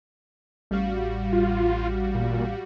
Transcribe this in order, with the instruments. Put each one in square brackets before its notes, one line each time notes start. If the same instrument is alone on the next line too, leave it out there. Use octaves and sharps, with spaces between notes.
[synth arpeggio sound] A1 F5 [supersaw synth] G3 F#4
[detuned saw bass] F4
A#2